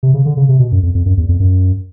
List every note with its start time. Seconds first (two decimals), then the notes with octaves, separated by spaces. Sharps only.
0.03 C3
0.14 C#3
0.26 D3
0.37 C#3
0.49 C3
0.59 B2
0.72 F#2
0.83 F2
0.95 F2
1.06 F#2
1.17 E2
1.29 F2
1.40 F#2